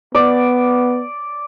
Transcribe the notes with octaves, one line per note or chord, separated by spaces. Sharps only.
B3 D5